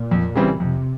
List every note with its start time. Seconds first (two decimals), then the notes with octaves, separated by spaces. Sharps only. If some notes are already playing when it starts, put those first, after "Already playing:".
Already playing: A#2
0.11 F2
0.35 C#3 E3 G3 C4
0.59 F2 C3